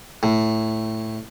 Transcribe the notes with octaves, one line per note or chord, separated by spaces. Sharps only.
A2